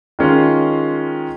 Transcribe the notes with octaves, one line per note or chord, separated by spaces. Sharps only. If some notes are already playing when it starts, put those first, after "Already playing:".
D#3 G#3 C#4 F4